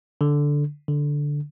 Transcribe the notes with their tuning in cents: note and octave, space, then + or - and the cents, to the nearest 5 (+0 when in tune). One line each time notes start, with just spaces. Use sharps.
D3 -5
D3 -5